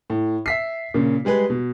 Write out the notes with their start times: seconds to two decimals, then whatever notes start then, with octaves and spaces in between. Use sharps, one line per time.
0.10 A2
0.46 E5 B6 C7
0.94 A#2 C#3
1.25 G3 G#3 G#4 B4
1.50 B2